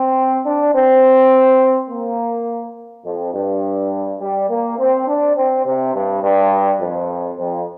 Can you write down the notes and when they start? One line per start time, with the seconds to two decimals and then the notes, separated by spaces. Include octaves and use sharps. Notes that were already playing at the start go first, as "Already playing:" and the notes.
Already playing: C4
0.46 D4
0.75 C4
1.90 A#3
3.05 F2
3.34 G2
4.21 G3
4.50 A#3
4.79 C4
5.08 D4
5.37 C4
5.66 C3
5.94 G2
6.23 G2
6.81 F2
7.39 F2